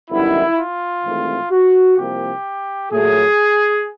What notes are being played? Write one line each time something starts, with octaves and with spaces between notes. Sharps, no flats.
G1 F#2 D#3 G3 B3 E4
F4
G#1 G2 E3 A3 C4
F#4
C2 C3 F3 A#3 G4
A#2 F#3 A3 G#4